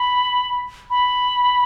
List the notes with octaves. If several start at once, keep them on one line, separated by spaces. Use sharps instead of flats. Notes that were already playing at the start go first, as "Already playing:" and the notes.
Already playing: B5
B5